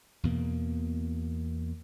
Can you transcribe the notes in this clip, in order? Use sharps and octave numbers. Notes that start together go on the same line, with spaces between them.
E2 B2 A#3